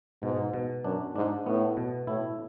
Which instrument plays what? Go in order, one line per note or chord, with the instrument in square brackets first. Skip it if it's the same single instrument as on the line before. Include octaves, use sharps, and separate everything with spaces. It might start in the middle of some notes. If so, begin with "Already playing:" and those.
[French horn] G#2 [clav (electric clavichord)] B2
[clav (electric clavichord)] B2
[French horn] F#2 [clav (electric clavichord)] D4
[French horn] G#2 [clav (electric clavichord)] D4
[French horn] A2 [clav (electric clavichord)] B3
[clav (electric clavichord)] B2
[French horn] A2 [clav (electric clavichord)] E4